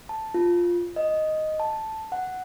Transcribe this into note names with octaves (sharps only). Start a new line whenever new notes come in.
A5
F4
D#5
A5
F#5